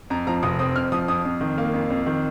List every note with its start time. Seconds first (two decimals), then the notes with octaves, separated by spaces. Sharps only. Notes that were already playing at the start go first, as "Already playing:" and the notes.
0.10 F2 A#5
0.27 F3 A#5
0.43 F1 D#6
0.59 C4 D#6
0.76 F2 F6
0.92 F3 D#6
1.08 F2 D#6
1.25 F2
1.41 D#3
1.58 A#3
1.74 F2
1.90 F2
2.06 D#3